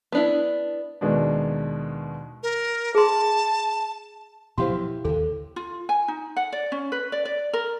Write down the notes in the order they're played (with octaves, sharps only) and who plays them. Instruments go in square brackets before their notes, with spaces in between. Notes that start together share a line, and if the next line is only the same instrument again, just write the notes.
[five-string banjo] B3 D4 E4
[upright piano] D#2 B2 D#3 G#3 B3 D4
[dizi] A#4
[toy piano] G#4 C6 [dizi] A5
[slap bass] B2 F3 F#3 [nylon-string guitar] E4 G4 F5 [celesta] C5 C6
[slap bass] D#2 D3 [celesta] A4
[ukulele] F4
G#5
D#4
F#5
D5
C#4
B4
D5
D5
A#4